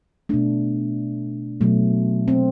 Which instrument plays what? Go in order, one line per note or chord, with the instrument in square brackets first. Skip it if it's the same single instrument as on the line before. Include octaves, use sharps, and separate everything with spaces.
[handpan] B2 A3 D4
B2 F#3 A3
C4